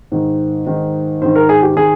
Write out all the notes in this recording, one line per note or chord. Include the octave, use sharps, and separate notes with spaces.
G#2 D#3
G#2 D#3
G#2 D#3 C5
A#4
G#4
G4
D#3 G#4